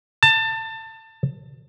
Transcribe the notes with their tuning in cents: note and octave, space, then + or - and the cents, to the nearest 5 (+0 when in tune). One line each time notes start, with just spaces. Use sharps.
A5 +25